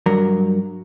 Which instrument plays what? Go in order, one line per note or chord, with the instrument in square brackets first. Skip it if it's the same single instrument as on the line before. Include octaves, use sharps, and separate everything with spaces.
[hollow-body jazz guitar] G2 F#3 A#4